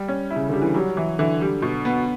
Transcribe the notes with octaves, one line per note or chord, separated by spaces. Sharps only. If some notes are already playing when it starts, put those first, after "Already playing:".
Already playing: G3
C#4
E4
C#3
D3 G3
E3
F#3 G3
E3
D3 E3
G3
B2
B3